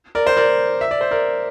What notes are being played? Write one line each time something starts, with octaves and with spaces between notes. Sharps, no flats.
A#4 D5
C5
A#4 D5
E5
D5
C5
A#4 D5